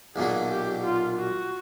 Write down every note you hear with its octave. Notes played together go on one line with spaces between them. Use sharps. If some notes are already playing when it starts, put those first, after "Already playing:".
B1 A#2 F#3 G#4
G4
F4
F#4